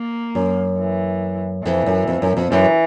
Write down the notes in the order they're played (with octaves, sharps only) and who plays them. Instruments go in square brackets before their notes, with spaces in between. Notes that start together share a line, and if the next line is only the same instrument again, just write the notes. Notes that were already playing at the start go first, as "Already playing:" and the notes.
Already playing: [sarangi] A#3
[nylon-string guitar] F#2
[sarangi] E3
[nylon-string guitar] F2 [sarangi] E3
[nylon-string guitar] F#2
F2
F#2
F2
[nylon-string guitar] F#2 [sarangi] E3